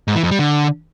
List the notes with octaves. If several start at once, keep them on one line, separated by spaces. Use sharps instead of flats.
G#2
E3
F2
G3
D3